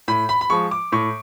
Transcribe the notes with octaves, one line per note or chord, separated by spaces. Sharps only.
A2 B5
B5
B5
F3 G#3 C#6
D6
A2 C#6